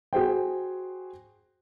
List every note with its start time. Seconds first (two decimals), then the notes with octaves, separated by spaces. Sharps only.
0.13 F#4 G#4 C5 G5